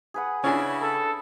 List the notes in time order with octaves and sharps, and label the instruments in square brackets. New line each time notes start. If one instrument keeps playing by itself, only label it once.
[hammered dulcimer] G#4 B4 F#5
[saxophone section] C#3 E4 [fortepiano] C#4 D4 G#5
[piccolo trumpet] A4